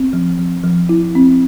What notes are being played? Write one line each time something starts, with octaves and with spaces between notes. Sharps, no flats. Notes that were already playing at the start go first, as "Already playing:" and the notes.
Already playing: C4
F3
F3
F3
E4
C4